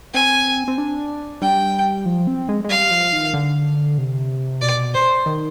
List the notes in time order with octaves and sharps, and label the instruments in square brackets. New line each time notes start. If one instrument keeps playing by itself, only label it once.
[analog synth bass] C4 [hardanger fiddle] G#5
[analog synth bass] C4
D4
[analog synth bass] G3 [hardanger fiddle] G5
[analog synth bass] F3
C4
G#3
G#3
[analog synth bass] G3 [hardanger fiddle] F5
[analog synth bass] F3
D#3
D3
C3
[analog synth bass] B2 [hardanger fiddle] D5
[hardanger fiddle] C5
[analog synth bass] D#3